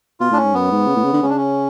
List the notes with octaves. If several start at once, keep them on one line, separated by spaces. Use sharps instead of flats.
B2 F4
A2 D4
C#4
G#2
F#2 B3
G#2
C#3
A2
C#3
D3
C#3 C#4
D4
C#4